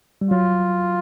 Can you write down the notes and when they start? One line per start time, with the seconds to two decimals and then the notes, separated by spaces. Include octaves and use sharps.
0.21 G3
0.31 F#3 F4